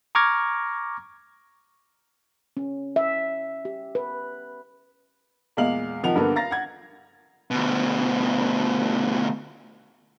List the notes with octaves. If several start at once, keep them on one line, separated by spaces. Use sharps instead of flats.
A#5 C#6 D6 F6 G#6 A#6
C#4
E5
G4
B4
E2 A#2 G#3 F5 F#7
C3 D#3 F3 F#5 F7
G2 D3 A#3 B3
F5 A#5 A6 A#6
F#5 G#6
D2 B2